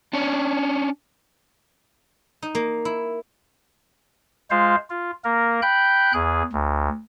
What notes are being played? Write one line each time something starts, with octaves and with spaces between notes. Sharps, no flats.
C#4 D4
D#4
A#3
E4
G#3 F4 C5 F5
F4
A#3 A#4
G5 B5 F#6 G6
E2 G#4
D2